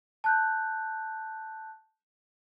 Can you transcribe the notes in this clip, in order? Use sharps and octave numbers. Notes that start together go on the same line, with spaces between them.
A5 F#6 G6